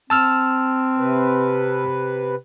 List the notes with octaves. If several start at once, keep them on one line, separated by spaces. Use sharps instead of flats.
C4 A5 E6 F6
C3 B4